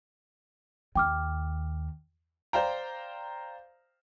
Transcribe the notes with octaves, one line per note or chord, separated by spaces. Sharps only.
D#2 G5 D6 F6
C5 D5 F5 G5 A#5